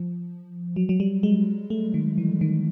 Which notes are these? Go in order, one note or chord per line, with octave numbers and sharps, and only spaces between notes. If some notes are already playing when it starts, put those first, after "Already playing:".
Already playing: F3
F#3
F#3
G3
G#3
A3
D#3
E3
D#3